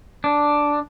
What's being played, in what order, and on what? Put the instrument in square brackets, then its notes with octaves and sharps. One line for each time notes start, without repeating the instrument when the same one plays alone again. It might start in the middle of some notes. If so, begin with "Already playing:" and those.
[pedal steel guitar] D4